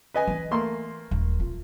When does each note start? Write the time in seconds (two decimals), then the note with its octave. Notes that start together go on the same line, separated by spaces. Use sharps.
0.14 B4 D#5 G#5
0.27 E3
0.51 A3 A#3 C6
1.11 D#1
1.40 F4